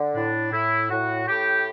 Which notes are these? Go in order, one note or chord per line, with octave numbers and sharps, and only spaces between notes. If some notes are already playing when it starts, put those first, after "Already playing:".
Already playing: D3
A2 D4
A2 E4
A2 F#4
A2 G4